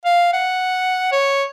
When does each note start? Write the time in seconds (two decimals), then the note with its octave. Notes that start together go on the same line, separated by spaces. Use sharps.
0.05 F5
0.33 F#5
1.12 C#5